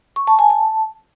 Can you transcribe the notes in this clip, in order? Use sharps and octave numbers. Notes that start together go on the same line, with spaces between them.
C#6
A5
G#5
A5